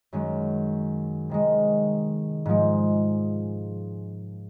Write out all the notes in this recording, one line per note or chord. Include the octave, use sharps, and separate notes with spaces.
F#2 D#3 G#3 C#4
C3 D#3 G#3
G#2 F3 G#3